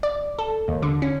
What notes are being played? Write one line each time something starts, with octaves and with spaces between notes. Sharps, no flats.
D5
A4
D#2
D3
C#4